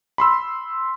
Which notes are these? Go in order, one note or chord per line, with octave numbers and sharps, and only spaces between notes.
B5 C6 E6